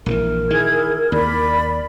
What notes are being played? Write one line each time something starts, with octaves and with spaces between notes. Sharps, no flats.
A#1 C#3 E3 A#4
D#3 E4 G#4 G#6
D#2 D5 B5